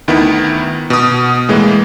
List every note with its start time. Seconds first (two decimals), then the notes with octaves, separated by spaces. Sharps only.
0.08 D2 D#3 B3 E4
0.90 B2 D#6
1.49 A2 E3 G#3 A#3